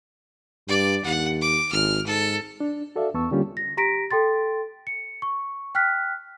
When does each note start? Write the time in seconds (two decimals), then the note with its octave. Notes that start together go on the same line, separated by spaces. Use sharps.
0.68 G2 D5
1.05 D#2 F#5
1.41 D6
1.72 G#1 F6
2.06 G#2 A4
2.60 D4
2.96 F#4 A4 D5 E5 F5
3.14 E2 B3 A5 C#6 E6
3.31 D3 G3 A#3 C#4 F4 G4
3.57 A#6
3.77 G4 A#5 A#6 B6 D7
4.11 A4 G5 C6 A6
4.87 C#7
5.22 C#6
5.75 G5 F6 F#6 B6